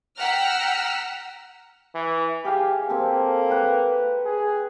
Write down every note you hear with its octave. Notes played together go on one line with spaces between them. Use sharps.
F#5 G5 A#5 E6 F6 B6
E3
G4 G#4 F5 G#5
A#3 C4 G4 A4
G4 B4 F#5
G#4